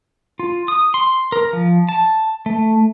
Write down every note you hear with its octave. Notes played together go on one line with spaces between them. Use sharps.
F4
D#6
C6
A#4
F3
A5
A3